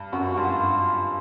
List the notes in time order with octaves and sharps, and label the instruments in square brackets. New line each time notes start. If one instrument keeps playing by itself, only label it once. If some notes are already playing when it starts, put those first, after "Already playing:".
Already playing: [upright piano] G2
[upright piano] F#2 [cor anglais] F#4
[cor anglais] F#4
[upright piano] G2 [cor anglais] F4